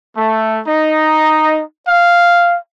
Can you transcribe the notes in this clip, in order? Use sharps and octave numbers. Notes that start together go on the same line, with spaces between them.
A3
D#4
F5